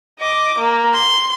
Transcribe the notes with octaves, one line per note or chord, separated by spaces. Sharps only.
D#5 D6
A#3
C6